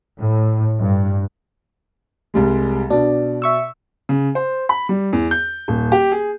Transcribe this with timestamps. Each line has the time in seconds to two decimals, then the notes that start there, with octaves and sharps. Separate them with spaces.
0.20 A2
0.80 G2
2.34 C2 G3 G#3
2.90 B2 D4 D5
3.42 E5 C#6 E6
4.09 C#3
4.35 C5
4.69 B5
4.89 G3
5.13 E2
5.31 G6
5.68 D#1
5.92 G4
6.12 G#4